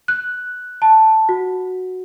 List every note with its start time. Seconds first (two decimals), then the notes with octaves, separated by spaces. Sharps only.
0.08 F#6
0.82 A5
1.29 F#4